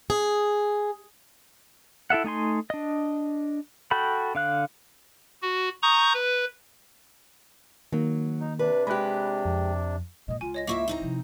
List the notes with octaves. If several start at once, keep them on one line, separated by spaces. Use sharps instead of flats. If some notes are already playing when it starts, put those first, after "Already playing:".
G#4
E4 A4 E5 F#5
A3 D#4 G#5 C6
D4 D#5
F#4 A4 G5 B5
D3 F5 F#6
F#4
A#5 C#6 D#6 G6
B4
D#3 F#3 A#3
D#4
C3 D4 B4
G#3 G4 B5 F#6
F2
F#2 A#2 D#5
C#2 F4 G#5
C#5 D#5 A#6
A#3 E4 F4 E5 C#6 D6
C4 D#4 E4 A#5
C3 F3